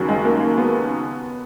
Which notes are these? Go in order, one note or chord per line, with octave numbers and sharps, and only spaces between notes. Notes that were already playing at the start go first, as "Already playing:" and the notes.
Already playing: D#2 C#3 F#3
G#3
A#3
B3